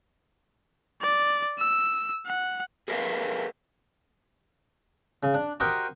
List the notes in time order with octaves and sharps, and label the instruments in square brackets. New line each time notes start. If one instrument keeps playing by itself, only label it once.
[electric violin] D5
E6
F#5
[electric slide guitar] G#4 A#4 B4 E5 F5
[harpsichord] C#3
D4
F#4 G4 A#4 C5 D#5